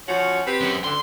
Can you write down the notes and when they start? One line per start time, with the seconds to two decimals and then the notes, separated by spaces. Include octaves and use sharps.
0.07 F3 C#4 F#4
0.45 C4 G4 B4
0.61 F#2
0.84 D2 D3 C6